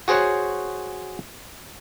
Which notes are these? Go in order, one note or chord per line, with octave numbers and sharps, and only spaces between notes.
F#4 G#4 C5 C#5 F#5